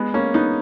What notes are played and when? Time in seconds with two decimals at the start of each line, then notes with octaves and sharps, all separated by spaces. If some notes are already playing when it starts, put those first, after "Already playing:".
Already playing: G#3 B3
0.14 A#3 C#4
0.34 B3 D#4